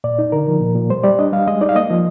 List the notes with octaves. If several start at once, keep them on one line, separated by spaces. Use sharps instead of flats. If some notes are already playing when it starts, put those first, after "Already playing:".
A#2 D5
D#4
D3 A#4
F3
A#2
A#2
G3 C5
G3 D5
D4 D#5
G3 F5
G#3 D#5
D#4 D5
F5
A#3 D#5
F3